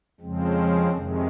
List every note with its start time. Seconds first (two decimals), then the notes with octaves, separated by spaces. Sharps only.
0.21 F2 C#3 F3 G#3 C4
0.90 F2 C3 D#3 G#3